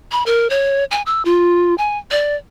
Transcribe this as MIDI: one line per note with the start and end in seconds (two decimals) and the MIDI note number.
0.12 0.23 83
0.26 0.49 70
0.50 0.84 73
0.91 1.02 80
1.06 1.22 88
1.25 1.77 65
1.78 1.98 80
2.11 2.36 74